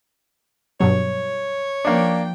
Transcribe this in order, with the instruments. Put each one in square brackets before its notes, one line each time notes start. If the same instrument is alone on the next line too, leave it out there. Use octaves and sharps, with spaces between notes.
[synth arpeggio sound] G2 B2 F#3 [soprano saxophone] C#5
[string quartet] F3 G5 [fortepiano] A#3 D4